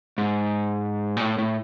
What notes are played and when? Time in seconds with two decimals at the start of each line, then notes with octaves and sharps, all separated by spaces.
0.18 G#2
1.17 A#2
1.21 A2
1.38 A2